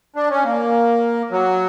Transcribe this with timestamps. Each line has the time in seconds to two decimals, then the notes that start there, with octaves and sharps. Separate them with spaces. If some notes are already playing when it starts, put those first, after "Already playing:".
0.16 D4
0.31 C#4
0.45 A#3
1.31 F#3